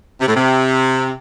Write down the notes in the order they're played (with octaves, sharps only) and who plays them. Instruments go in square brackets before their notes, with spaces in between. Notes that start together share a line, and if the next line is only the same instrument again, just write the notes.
[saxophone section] C3
A2
C3